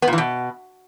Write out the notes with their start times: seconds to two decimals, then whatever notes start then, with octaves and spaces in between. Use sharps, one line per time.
0.02 B3
0.08 A#2
0.13 E3
0.18 B2